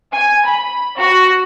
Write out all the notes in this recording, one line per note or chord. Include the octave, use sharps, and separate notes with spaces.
G#5
B5
F#4